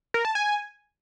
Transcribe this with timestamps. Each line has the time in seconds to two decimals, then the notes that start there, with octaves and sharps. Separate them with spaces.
0.14 A#4
0.25 A5
0.35 G#5